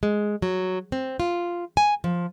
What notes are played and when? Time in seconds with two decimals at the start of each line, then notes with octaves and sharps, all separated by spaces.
0.03 G#3
0.42 F#3
0.92 C4
1.20 F4
1.77 G#5
2.04 F3